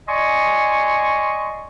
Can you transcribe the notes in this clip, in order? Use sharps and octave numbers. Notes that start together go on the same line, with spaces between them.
D5 D#5 G#5 C6 C#6